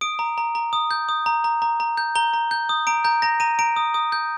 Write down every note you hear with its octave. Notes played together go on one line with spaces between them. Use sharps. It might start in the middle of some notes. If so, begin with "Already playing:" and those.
D#6 D7
A#5
A#5
A#5
D#6
G6
D#6
A#5
A#5
A#5
A#5
G6
A#5 G7
A#5
G6
D#6
A#5 D7
A#5 G6
A#5 A#6
A#5 D#7
A#5 D7
D#6
D#6
G6